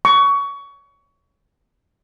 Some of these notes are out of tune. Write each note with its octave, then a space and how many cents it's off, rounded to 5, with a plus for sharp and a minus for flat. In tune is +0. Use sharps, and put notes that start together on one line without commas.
C#6 +25